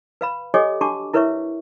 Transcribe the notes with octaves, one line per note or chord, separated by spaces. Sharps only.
B4 F5 B5
G4 A4 C#5 D#5 G#5 D6
D4 F#4 G4 A5 C#6 D6
E4 A#4 B4 C#5 E5 C#6